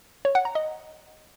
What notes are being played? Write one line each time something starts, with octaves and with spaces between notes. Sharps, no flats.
C#5
F#5
A#5
D#5